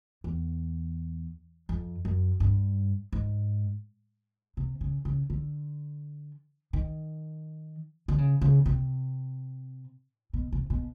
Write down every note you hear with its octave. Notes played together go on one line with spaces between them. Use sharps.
E2
F2
F#2
G2
G#2
C3
C#3
C#3
D3
D#3
D3
C#3
C#3
C3
B2
C3
B2